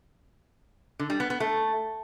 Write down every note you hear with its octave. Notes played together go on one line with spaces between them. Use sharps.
D3
G3
B3
B3
A3